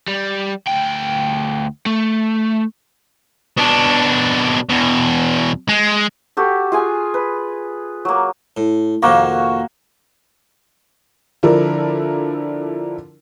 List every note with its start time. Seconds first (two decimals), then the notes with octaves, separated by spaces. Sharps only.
0.08 G3
0.67 D2 G5
1.86 A3
3.57 B2 D4
4.69 E2 B2
5.69 G#3
6.37 F#4 G4 A4
6.72 F4 G#4 G#5
7.14 B4
8.05 F#3 A#3
8.57 A2
9.02 F2 C3 D#3 A#3 F#4
11.43 D3 F3 D4 E4 A4 A#4